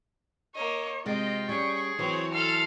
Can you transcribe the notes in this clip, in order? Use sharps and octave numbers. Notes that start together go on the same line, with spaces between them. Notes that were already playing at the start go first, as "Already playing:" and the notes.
A#3 C#5 D#5
C3 G#3 F4 D#5 G5
G3 C#4 G#4 C#6
E3 F#3 C4 C#5
A4 A5 C6 F6